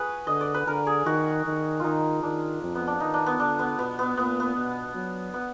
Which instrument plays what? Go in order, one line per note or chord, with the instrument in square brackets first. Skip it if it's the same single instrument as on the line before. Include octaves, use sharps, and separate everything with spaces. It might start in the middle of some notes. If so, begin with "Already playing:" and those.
Already playing: [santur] F#4 G#4 B4
[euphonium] D3 [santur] D#5
[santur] D5
B4
[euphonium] D3 [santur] A#4
[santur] G#4
[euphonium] D#3 [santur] F#4
[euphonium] D#3
[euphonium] D#3 [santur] D#4 F4
[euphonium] D#3 [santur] D4
[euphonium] F2
[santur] B3
D4
[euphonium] D#3 [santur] D#4
[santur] D4
B3
[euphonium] D3 [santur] D4
[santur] B3
[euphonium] B2 [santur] B3
[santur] B3
[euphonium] A#2 [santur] B3
[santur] B3
[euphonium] B2
F#3
[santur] B3